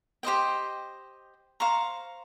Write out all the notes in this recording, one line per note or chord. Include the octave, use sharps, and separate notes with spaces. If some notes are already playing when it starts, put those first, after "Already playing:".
G4 C5 D#5 G5
C5 F5 A#5 C#6